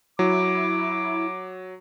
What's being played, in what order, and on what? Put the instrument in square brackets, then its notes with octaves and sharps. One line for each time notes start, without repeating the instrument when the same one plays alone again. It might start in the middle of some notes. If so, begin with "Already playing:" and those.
[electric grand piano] F#3 [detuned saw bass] E4 [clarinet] D6